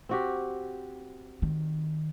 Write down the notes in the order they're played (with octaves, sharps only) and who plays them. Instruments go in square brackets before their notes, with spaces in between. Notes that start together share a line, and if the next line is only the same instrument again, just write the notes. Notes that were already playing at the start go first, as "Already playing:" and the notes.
[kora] C4 F#4 G4
[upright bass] D#3